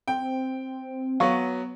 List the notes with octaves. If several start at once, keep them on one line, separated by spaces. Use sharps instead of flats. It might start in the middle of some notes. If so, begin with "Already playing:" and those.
C4 G5
F#3 B3 F5 C#6